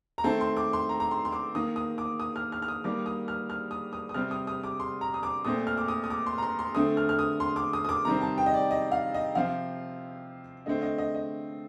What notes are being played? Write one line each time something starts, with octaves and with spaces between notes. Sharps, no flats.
A#5
D#3 A3 C4 A5
C6
D6
C6
A#5
A#5
C6
C6
D6
D#3 A#3 D#6
D#6
D6
D#6
F6
F6
F6
D#6
D#3 G3 A#3 D6
D#6
F6
F6
D#6
D#6
D#6
C3 G3 C4 F6
D#6
D#6
D6
C6
A#5
D#6
D6
A#2 A3 C4 D#6
F6
D6
D#6
D#6
D6
C6
A#5
C6
C6
D3 A3 C4 D#6
F6
F6
D#6
C6
D6
D#6
D#6
D6
C3 D#3 G3 C4 A#5
A5
G5
D#5
D5
D#5
F5
D#5
C3 F3 C4 F5
D3 A3 C4 D#5
D#5
D#5
D#5